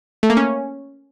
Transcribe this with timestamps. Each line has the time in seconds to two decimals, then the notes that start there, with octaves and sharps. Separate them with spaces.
0.23 A3
0.30 A#3
0.37 C#4